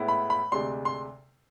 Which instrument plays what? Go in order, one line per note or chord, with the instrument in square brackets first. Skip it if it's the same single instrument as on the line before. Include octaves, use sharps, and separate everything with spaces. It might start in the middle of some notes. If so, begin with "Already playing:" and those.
Already playing: [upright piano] A2 G#3 B3 E4
B5
B5
D2 C3 G#3 D4 C6
C6